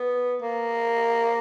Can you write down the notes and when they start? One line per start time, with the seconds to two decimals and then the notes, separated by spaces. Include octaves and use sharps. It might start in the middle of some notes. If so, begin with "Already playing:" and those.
Already playing: B3
0.42 A#3